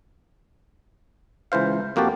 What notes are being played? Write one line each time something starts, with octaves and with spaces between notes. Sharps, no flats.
C#2 E3 C5 F5
F2 A#3 F#4 G4 A5